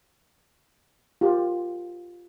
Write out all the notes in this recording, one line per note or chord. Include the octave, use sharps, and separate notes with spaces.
F4 G4 A#4